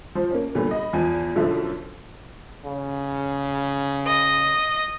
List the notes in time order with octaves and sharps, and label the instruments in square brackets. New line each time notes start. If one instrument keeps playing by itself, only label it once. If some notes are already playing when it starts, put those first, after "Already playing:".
[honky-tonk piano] F3 C5
A#3 C#4
A#2 D3 F#3 G3 B3
D#5 B5
E2 F3 G#5
F#2 B2 D3 F3 E4
[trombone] C#3
[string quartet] D#5